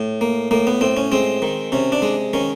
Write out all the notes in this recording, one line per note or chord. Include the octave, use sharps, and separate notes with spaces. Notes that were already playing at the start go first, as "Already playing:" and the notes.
Already playing: A2
A#3
A2 A#3
B3
A2 C4
C#4
G#3 C4
D#3
C3 C#4
D4
G#3
D#3 C#4